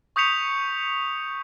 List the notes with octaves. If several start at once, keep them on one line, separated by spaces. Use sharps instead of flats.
C#6 D#6 G6 B6 C#7 F7